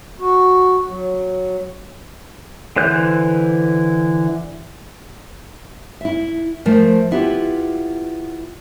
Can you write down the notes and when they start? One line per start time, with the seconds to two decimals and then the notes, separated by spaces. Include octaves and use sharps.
0.20 F#4
0.88 F#3
2.76 D3 E3 C5 F#6
6.01 E4 E5
6.65 F3 A3 A#4 C5
7.11 B3 E4 F4 G4 B4